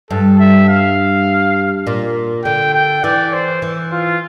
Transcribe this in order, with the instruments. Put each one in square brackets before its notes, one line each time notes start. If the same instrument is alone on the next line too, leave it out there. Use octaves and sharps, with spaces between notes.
[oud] G2 [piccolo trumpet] A4
[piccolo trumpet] E5
F5
[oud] A#2
[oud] D3 [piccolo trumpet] G5
[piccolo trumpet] G5
[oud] E3 [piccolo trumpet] D5
[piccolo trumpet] C5
[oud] E3
[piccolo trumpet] F4